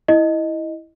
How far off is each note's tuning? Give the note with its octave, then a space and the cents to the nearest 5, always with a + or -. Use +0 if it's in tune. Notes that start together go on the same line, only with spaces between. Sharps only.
E4 -10 D#5 +0